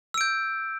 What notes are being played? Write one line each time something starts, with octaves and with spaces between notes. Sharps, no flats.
E6 G6 D7